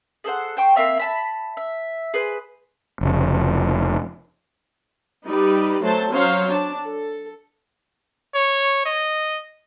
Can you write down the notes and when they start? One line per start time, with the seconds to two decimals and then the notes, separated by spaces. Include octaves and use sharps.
0.24 G#4 A4 C5 F#5
0.57 C5 G5 C#6
0.76 A#3 C4 E5 F5
1.00 E5 A5 B5
1.57 E5
2.14 G#4 B4 C5
3.01 F1 C#3
5.26 G3 D#4 B4 D5
5.81 F#3 A3 C5 A5
6.11 F#3 C#4 C5 C#5 F5
6.50 D4 A5
6.85 A4
8.35 C#5
8.86 D#5